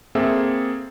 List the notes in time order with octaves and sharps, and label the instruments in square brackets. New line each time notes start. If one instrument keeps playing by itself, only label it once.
[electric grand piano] A#3 C4 G#4 A4 E5